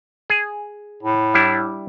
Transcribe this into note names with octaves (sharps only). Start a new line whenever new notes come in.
G#4
A2
G3 D4 E4